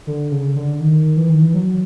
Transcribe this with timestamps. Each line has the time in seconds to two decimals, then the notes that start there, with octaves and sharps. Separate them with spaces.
0.07 D3
0.32 C#3
0.56 D3
0.80 D#3
1.17 E3
1.29 D#3
1.41 E3
1.54 F#3